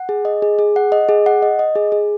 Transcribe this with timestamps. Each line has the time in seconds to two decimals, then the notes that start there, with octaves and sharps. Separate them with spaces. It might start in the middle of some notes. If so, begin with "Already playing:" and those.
Already playing: F#5
0.09 G#4
0.25 D#5
0.42 G#4
0.59 G#4
0.76 F#5
0.92 D#5
1.09 G#4
1.26 F#5
1.42 D#5
1.59 D#5
1.75 G#4
1.92 G#4